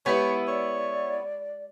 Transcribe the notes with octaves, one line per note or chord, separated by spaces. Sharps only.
G#3 B3 E4 G4 B4 C#5 F#5
C#5 D5